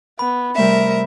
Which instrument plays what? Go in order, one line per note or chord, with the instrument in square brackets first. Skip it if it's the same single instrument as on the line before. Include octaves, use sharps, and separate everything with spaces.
[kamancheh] B3 [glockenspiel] B5
[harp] C3 G3 A3 [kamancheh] A#4 [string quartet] E5